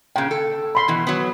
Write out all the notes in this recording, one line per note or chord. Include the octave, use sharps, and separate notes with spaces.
A#2 C#3 G5
A4
B5 C6
B2 E3
F#3 B3